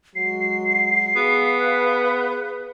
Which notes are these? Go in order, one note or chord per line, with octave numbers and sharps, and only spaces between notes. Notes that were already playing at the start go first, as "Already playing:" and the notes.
F#3 G#3 F#4 C7
B3 G#4 B4 F5